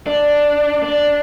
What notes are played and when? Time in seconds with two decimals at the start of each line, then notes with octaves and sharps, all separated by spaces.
0.07 D4
0.83 D4